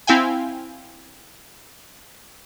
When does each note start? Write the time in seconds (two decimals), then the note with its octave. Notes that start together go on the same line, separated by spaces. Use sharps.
0.07 C4 E4 F5 G5 G#5